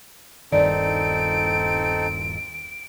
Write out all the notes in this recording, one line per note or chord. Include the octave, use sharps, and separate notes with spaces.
D#1 G2 D#3 C4 D#4 A4 D5 D7